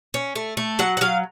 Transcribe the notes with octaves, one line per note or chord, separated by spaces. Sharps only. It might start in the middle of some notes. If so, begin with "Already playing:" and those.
C#4
A3
A3
F#3 F#5
F#5
F#3 F5